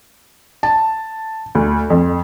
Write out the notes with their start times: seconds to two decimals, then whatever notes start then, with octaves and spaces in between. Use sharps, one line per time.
0.63 A5
1.55 D2
1.90 F2